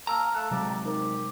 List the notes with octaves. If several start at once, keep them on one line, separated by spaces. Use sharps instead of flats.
A#3 A#4 A5 A#5 E6 F6
A3 A4 F5 A5 F#6
C3 F#3 G#3 G4 D5
D#4 G4 A#4 C5